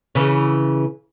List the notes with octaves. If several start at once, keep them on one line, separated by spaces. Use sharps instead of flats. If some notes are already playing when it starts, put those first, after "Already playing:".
C#3 E3